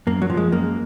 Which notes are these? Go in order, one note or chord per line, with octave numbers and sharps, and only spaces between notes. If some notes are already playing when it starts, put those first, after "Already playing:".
F#2 A#3
F#3
F3
G#3
F#2 A#3